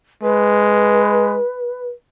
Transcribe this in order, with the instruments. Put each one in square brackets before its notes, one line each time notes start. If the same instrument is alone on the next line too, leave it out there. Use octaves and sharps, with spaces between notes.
[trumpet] G#3 [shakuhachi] B4